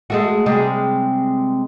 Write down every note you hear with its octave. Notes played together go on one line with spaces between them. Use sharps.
G#3 A3 F#4
C3 G3 G#3